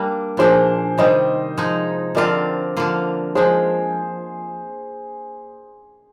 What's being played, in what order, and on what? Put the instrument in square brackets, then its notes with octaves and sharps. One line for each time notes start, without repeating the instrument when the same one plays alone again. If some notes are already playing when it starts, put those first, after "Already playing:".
Already playing: [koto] G3 A#3 D4
[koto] A#2 F3 A#3 D4 [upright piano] G#4 C5
[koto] C3 D#3 G3 [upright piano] C5 D#5
[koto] F3 G#3 D#4
[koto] D3 F3 C4 F4 [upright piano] A#4 D5
[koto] D3 F3 A#3 F4
[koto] F3 G#3 D4 [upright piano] G#4 C5